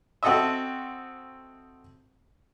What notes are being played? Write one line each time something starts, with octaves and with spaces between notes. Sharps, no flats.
C4 F#4 A4 D#5 E5